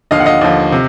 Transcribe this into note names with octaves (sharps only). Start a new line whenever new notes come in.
D#2 D3 F3 D#5 F5
F#5
D#5 F5
D#2 D3 F3
C3